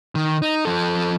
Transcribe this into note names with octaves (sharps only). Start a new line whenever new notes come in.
D#3
D#4
F3 A4